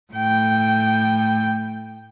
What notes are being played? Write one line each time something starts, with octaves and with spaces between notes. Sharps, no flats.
A2 G5